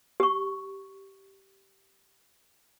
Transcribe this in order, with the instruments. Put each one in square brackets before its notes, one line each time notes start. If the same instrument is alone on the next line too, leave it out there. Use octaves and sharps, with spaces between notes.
[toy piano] G4 C#6